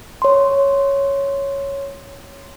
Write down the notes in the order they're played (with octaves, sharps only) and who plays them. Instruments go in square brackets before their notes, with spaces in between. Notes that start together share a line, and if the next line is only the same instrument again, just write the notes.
[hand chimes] C#5 C6